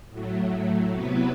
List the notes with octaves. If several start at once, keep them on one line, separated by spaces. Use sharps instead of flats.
A2 F#3 A3
C3 F#3 B3 E4 B4